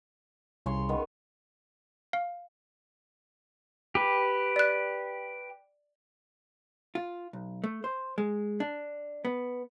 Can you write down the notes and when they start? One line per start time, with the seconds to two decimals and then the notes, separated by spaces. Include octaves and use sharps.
0.66 C2 C#3 C#5 C6
0.89 D#3 B3
2.13 F5
3.95 G4 B4
4.56 D5 F#6
6.95 F4
7.33 B1
7.64 A3
7.84 C5
8.18 G#3
8.60 D4
9.25 B3